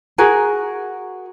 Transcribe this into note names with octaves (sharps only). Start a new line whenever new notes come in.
F#4 G#4 A#4